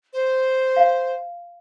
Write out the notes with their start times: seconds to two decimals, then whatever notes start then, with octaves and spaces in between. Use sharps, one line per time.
0.13 C5
0.76 F5